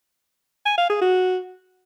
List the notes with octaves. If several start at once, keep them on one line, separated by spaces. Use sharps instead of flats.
G#5
F5
G#4
F#4